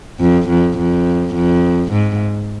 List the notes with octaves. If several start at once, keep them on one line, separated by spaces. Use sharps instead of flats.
F2
F2
F2
F2
G#2